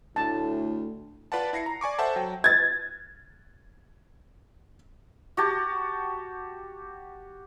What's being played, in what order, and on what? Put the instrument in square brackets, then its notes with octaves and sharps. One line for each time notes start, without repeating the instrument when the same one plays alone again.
[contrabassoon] D2 [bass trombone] A2 [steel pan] A5
[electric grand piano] F4 B4 D5 F#5 A5
E4 A#6 C7 C#7
A#5
D5 G#5 C#6 D6
A4 C5 E5 F#5 A5
F#3 G5
[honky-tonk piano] G#6 A6
[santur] F#4 G4 A5